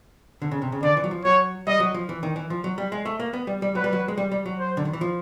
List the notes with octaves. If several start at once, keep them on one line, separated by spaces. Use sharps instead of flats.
D3
C#3
C3
C#3
D3 D5
E3
F#3
F3
F#3 C#5
G3 D#5
F#3
F3
E3
D#3
E3
F3
F#3
G3
G#3
A3
A#3
B3
G3
G3
F#3 B4
G3
F#3
G#3
G3
G3
F#3
C5
D3
D#3
E3
F3